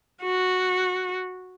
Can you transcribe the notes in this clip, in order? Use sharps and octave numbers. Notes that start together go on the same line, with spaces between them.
F#4